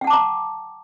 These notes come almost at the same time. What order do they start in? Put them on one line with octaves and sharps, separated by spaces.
G5 F#5 A5 D6 A#5